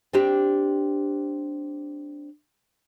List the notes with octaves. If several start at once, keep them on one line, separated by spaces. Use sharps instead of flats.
C4 D4 G4